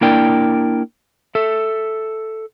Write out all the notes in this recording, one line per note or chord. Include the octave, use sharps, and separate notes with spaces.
A#3 D4 E4 A#4 D5 G5
A4 E5